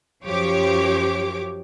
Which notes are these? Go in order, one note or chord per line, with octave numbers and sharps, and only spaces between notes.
F#2 F3 G4 C#5 D6